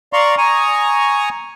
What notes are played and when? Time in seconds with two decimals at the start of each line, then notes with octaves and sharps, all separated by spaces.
0.13 D5 F5 A#5 C6 C#6
0.38 G#5 A#5 C#6 D#6